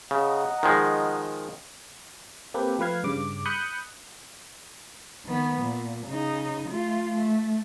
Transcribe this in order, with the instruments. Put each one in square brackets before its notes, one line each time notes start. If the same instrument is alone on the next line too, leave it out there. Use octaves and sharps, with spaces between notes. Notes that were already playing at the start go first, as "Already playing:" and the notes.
[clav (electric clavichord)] C#3 [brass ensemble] D#5 F#5 A#5
[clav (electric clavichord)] D#3 F3 G#3
[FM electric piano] A#3 C4 G4 A4 B4
F3 A3 B4 F5 G#6
G2 C#3 D6
B5 D#6 F#6 G6 C#7
[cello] D#3 B3
A#2
C#3 D#4
A3 F4
A3